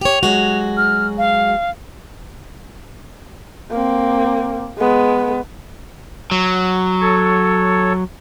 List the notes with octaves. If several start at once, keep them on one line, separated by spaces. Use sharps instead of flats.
G4 C#5 F7
F#3 G#3 F#4
F6
F5
A#3 C4
G#3 B3
F#3
A4 C#5